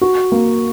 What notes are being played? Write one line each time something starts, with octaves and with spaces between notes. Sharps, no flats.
F#4
A#3